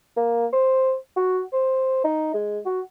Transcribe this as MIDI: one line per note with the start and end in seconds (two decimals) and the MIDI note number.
0.17 0.46 58
0.53 0.95 72
1.16 1.42 66
1.53 2.00 72
2.04 2.33 63
2.34 2.60 56
2.65 2.81 66